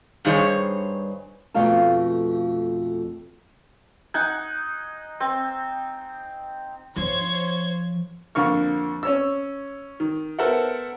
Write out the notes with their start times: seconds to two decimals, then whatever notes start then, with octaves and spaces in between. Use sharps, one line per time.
0.25 G2 D#3 G#4 C5 C#5
1.54 F2 B2 A3 F5 A5
4.14 D#4 F#5 G#5
5.20 C4
6.96 F3 C5 C#5 G#6
8.35 F2 D3 A#3 C#6 F6
9.03 C#4 C#5 E6
10.00 D#3
10.39 B3 A4 A#4 C5 E5 F#5